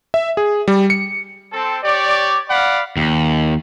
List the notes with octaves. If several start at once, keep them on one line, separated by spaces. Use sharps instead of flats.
E5
G#4
G3
C#7
C4 A4
G4 C#5 D5
D5 F5 F#5 B5
D#2